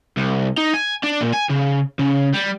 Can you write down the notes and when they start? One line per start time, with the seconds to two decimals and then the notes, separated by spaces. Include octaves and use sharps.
0.17 C2
0.58 D#4
0.74 G#5
1.03 D4
1.21 A#2
1.34 G#5
1.50 C#3
1.99 C#3
2.34 G3